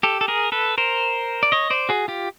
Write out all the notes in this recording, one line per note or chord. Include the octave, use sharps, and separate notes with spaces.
G4 A4
A4
G#4 A#4
A4 B4
A#4 C5
D5
C#5 D#5
C5 D5
F#4 G#4
F4 G4